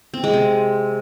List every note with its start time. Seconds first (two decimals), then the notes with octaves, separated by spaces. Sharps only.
0.14 C4
0.24 G#3
0.34 C3